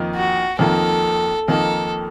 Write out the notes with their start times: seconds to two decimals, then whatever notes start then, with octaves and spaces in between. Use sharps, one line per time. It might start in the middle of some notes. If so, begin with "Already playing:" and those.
Already playing: F2 D#3 A#3 D#4
0.15 F#4
0.59 F2 D#3 A#3 D#4 A4
1.48 F2 D#3 A#3 D#4 A4